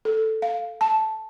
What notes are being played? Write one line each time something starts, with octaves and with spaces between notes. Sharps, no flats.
A4
F5
A5